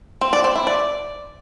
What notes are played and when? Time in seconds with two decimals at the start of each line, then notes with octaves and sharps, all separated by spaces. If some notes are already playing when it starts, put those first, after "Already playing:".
0.21 C4
0.33 D5
0.44 C4
0.55 E4
0.67 D5